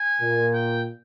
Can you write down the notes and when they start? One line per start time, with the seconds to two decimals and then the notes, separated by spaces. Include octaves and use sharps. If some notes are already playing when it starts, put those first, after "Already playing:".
Already playing: G#5
0.21 A#2
0.54 G5